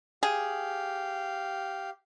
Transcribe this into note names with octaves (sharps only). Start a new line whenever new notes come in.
G4 G#4 F5